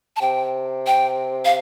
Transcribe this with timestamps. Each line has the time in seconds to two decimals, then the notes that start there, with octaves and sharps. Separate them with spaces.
0.16 A5
0.21 C3 G5
0.87 G5
1.45 F5